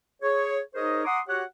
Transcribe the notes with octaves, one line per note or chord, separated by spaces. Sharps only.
G#4 C#5
D#4 G#4 A#4 C5 C#5 D#5
F#5 A#5 C6 D6 D#6
F#4 G4 C#5 F#5